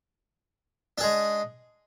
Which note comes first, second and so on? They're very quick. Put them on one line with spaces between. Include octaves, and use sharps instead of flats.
D4 G#4 G#3